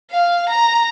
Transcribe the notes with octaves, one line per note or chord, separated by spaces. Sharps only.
F5
A#5